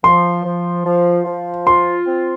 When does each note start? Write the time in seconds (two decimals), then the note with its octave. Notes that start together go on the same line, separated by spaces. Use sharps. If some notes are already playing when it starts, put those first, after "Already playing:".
0.04 F3 C6
0.44 F3
0.85 F3
1.25 F3
1.66 F4 C6
2.06 C4